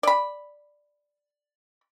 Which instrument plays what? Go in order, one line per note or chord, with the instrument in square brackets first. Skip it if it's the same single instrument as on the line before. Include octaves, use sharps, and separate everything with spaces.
[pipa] D5 B5